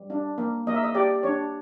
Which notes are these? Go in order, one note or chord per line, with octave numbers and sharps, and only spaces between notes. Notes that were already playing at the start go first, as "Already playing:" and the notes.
Already playing: G3
D4
A#3
A#3 D#5
E5
D#5
G4 D5
D4 C#5